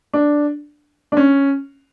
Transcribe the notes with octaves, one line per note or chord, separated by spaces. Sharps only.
D4
D4
C#4